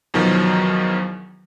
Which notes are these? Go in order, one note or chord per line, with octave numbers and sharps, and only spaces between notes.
E2 B2 D#3 F3 F#3